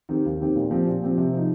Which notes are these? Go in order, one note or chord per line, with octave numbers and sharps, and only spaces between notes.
D#3 C4 G4
D#2
D#3 C4 G4
A#2
F3 C4 G4
A#2
F3 C4 G4
C3
F3 D#4